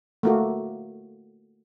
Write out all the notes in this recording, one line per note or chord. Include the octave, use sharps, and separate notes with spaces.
A3 A#3 F#4